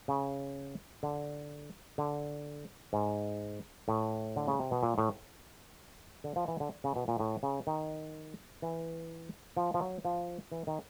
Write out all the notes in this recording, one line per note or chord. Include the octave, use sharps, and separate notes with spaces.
C#3
D3
D3
G#2
A2
D3
C#3
C3
B2
A#2
A2
D3
F3
E3
D3
C#3
B2
A#2
A2
C#3
D#3
E3
F3
F3
F#3
F3
E3
D#3